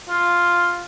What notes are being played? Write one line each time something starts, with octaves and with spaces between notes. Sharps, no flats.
F4